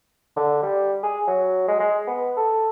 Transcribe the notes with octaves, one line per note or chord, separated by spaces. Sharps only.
D3
G3
G#4
F#3
G#3
G#3
B3
A4